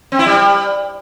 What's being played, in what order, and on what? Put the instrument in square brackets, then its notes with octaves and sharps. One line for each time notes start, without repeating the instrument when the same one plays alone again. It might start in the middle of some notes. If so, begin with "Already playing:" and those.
[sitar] C4
E4
G3